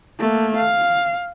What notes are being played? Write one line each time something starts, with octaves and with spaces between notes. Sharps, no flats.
A3 A#3
F5